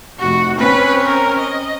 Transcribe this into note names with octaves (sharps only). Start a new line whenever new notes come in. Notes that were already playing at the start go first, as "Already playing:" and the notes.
F1 F#4
C4 C#4 B4
A#4
D#5